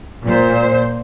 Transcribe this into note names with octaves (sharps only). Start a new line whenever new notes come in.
A#2 C5